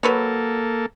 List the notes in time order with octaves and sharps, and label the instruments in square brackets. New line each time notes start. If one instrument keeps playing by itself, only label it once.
[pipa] F#3 B4 C#5 [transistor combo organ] A#3 A4